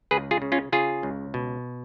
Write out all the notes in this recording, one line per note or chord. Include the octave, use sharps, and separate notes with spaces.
C#2 G#4 B4
F4 G#4
C#3
C#4 F4
C#3 F4 G#4
C#2
B2